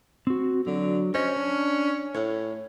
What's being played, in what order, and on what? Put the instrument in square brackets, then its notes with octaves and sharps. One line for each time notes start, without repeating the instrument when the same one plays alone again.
[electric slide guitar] C4 F#4
[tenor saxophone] D3 [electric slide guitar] F#3
[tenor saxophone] C#4 [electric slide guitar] C5 C#5 D#5
[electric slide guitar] D4
[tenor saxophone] A2 [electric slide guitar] C#5